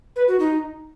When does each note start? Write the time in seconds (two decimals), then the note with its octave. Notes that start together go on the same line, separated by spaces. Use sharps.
0.16 B4
0.28 F#4
0.40 D#4